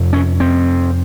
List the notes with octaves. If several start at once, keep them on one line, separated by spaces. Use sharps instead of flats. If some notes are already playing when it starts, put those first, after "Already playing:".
Already playing: F2 C3
C#4
C4